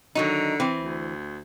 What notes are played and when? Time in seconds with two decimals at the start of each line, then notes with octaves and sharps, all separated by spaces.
0.15 D3 D#3 F#3 D#4
0.60 E3 C4
0.78 D2